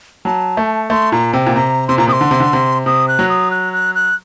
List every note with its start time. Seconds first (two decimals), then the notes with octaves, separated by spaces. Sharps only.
0.25 F#3 A5
0.57 A3
0.90 A3 C6
1.12 A#2 A#5
1.33 C3 G5
1.47 A#2
1.55 C3 A#5
1.88 C3 C6
1.98 A#2 A#5
2.08 C3 D#6
2.12 C6
2.21 D3
2.31 C3
2.40 D3
2.53 C3
2.86 C3 D#6
3.08 F#6
3.19 F#3
3.29 D#6
3.51 F#6
3.73 F#6
3.95 F#6